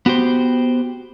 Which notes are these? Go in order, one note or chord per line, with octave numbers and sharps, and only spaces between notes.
B3 F#4 G4 C5